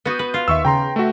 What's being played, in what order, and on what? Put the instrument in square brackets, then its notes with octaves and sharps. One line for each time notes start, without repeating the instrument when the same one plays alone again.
[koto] B3 F#4 [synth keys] D#6 G6 D#7
[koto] B4
F4
[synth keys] D#2 D#3 [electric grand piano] E5 C#6 E6
[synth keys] C#3 [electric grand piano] G5 A#5 C6
[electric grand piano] A3 F#4 [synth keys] E5 G5